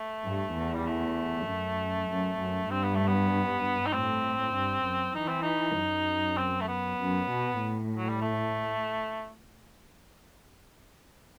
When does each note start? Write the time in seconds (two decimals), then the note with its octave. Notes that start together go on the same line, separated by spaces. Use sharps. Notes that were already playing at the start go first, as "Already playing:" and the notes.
Already playing: A3
0.24 G2
0.55 E2
0.74 G3
0.87 A3
1.48 F#2
2.09 F#2
2.39 F#2
2.70 G2 C4
2.83 B3
2.95 A3
3.07 B3
3.86 D#4
3.93 A2 C4
4.54 G2
4.84 F#2
5.15 E3 D#4
5.28 C4
5.43 D#4
5.77 F#2
6.38 C4
6.61 A3
6.68 B3
6.99 F#2
7.30 B2
7.60 A2
7.97 F#3
8.09 G3
8.21 A3